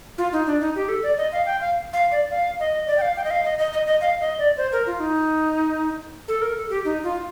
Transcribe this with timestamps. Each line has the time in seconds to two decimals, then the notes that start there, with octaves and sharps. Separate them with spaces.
0.18 F4
0.33 D#4
0.47 D4
0.61 D#4
0.75 G4
0.89 A4
1.03 D5
1.17 D#5
1.32 F5
1.46 G5
1.60 F5
1.93 F5
2.12 D5
2.31 F5
2.60 D#5
2.87 D5
2.98 G5
3.02 F5
3.16 G5
3.24 D#5
3.31 F5
3.44 D#5
3.58 D#5
3.73 D#5
3.86 D#5
4.01 F5
4.21 D#5
4.39 D5
4.57 C5
4.73 A#4
4.87 F4
5.00 D#4
6.28 A4
6.42 A#4
6.56 A4
6.70 G4
6.85 D#4
7.04 F4